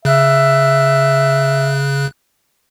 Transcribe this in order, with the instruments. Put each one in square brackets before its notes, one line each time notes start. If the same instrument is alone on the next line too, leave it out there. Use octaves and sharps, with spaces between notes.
[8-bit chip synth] C#3 F#6 [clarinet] E5